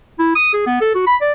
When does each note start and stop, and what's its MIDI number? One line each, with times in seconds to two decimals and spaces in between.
0.19 0.31 64
0.36 0.49 87
0.53 0.66 68
0.67 0.81 59
0.81 0.90 69
0.95 1.02 66
1.07 1.16 83
1.21 1.33 74